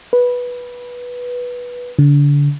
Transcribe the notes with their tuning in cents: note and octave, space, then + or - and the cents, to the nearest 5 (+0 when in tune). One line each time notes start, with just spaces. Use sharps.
B4 -10
D3 -30